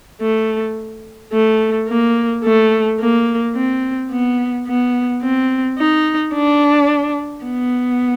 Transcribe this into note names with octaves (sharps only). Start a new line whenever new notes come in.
A3
A3
A#3
A3
A#3
C4
B3
B3
C4
D#4
D4
B3